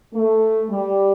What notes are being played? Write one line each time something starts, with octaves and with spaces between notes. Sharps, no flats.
A3
G3